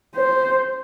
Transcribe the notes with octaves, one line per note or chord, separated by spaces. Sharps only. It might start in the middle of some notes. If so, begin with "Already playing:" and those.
C5